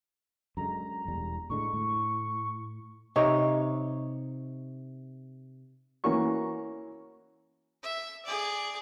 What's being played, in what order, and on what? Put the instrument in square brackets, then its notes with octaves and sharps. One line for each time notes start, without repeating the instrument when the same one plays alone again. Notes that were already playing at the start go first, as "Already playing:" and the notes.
[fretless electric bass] F#2 D3 G#3 [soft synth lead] A#5
[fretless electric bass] E1 E2 G3
[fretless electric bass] A2 D3 G#3 [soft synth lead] C#6
[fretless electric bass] A2
[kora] C3 D#4 C#5
[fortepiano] E3 A#3 C#4 F#4 C#6
[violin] E5
G#4 D5